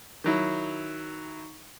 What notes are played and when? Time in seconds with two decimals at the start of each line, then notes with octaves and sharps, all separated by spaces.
0.24 D#3 F#3 E4